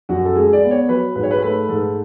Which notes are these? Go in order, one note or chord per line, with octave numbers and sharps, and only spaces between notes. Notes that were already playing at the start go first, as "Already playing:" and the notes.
F#2 F#4
A4
G#3 G#4
D5
B3
C#5
F#3 B4
G#2 B4
C#5
B4
A3 B4
G#2 A4